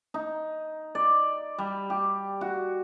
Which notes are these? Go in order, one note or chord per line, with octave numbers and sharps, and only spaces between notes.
D#4
D5
G3
G4
F#4